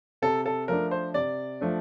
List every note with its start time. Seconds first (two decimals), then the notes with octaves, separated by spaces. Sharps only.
0.22 C3 A4
0.46 A4
0.68 F3 A3 D4 A#4
0.91 C5
1.14 C3 D5
1.61 F3 A3 D4